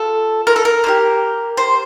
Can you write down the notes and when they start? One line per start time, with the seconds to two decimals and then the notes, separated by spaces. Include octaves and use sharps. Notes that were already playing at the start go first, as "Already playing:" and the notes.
Already playing: F4 A4
0.47 A#4
0.56 A4
0.65 A#4
0.84 A#3 D#4 G4
1.57 C5